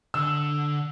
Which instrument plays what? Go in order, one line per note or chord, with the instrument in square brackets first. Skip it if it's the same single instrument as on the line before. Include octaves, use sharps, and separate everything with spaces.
[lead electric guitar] D3 [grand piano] E6